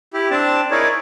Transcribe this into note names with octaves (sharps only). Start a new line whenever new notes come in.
E4 G4
C4 D4 A5
D#4 E4 G#4 A#4 C#5 D5